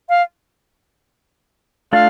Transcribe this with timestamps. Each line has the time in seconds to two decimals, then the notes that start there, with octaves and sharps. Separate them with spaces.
0.09 F5
1.93 A3 D4 F4 F5